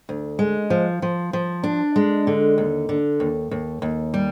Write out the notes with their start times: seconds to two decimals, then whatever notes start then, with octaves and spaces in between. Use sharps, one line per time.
0.09 D2
0.39 G#3
0.70 F3
1.02 F3
1.33 F3
1.63 D4
1.96 G#3
2.27 D3
2.58 D#2
2.89 D3
3.20 D#2
3.51 D#2
3.82 D#2
4.14 G3